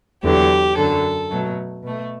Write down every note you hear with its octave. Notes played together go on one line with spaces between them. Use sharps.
E2 D3 F#3 G4
F#2 D3 F#3 A4
B2 F#3 A3
B2 A3